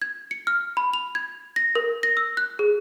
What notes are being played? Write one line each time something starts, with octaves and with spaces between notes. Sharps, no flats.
G#6
C#7
F6
B5
F7
G#6
A#6
A#4
A#6
E6
F#6
G#4